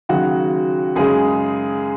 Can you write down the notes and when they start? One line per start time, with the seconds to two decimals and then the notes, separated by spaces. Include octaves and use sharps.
0.09 D#2 C#3 F#3 F#4
0.96 F#2 C#3 G#3 G#4